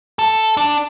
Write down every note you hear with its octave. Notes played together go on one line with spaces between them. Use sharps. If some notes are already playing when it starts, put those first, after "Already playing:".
A4
D4